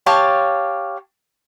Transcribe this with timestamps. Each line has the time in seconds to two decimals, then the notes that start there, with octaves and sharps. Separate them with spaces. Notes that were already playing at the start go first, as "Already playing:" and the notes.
0.06 G4 C#5 F5 A5